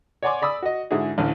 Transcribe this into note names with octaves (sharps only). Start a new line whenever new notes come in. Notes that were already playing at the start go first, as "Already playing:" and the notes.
C#5 D5 F#5 G#5 C6 D6
D5 B5 D#6 E6
F#4 D#5
G#2 D3 E4 F#4 G#4
A1 D2